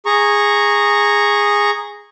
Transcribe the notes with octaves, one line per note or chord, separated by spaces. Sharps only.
G#4 A#5 C#6